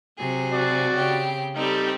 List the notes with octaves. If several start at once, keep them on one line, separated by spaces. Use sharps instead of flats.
C3 F#3 G#4
F#4 D5
C#3 C4 G4
G3 C4 D#4 G4 A4